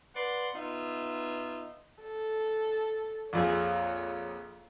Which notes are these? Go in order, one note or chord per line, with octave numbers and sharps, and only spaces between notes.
B4 D5 F#5 C6
B3 D#4 F4 E5
A4
A#1 F2 G#4 C#5